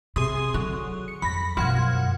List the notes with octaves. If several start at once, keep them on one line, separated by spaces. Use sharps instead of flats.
C3 G#4 C6 D#6
D3 F#3
C#7
F2 B5 A#6
F#2 B2 F3 F#5 G#6